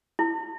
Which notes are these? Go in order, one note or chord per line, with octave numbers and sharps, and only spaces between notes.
E4